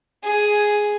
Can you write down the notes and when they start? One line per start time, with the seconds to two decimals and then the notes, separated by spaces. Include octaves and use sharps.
0.23 G#4